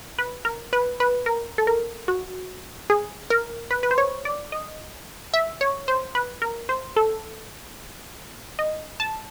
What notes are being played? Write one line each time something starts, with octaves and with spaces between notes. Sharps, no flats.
B4
A#4
B4
B4
A#4
A4
A#4
F#4
G#4
A#4
B4
B4
C5
C#5
D5
D#5
E5
C#5
C5
B4
A#4
C5
A4
D#5
A5